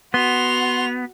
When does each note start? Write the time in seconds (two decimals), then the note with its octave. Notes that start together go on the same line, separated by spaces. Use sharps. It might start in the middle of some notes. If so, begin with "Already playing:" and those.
0.14 B3 F#4 C6 F7